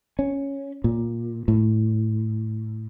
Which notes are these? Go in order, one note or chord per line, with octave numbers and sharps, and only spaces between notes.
C#4
A#2
A2